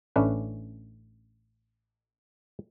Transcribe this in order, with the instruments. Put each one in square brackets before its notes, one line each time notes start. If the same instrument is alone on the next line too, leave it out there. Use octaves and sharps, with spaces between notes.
[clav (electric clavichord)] A1 A3 C#4 D4 B4